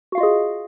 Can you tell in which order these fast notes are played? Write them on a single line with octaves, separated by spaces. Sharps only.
F#4 F5 F4 D#5 G#4